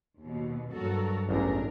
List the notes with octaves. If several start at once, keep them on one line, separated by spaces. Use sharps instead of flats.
D#2 B2
G2 F#3 F#4 A4 A#4
A1 E2 D4 A#4